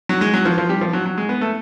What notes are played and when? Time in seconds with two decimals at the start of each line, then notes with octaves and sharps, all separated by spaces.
0.09 F#3
0.21 G#3
0.34 F#3
0.45 F3
0.58 F3
0.69 G3
0.81 F3
0.93 F#3
1.06 F#3
1.18 G#3
1.29 B3
1.41 A3